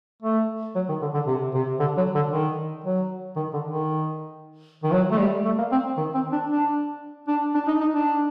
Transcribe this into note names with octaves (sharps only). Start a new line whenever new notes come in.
A3
F#3
D#3
D3
D3
C3
C3
D3
F#3
D3
D#3
F#3
D#3
D3
D#3
D#3
F#3
A3
G3
A3
A#3
C4
D#3
C4
D4
D4
D4
D4
D#4
D#4
D4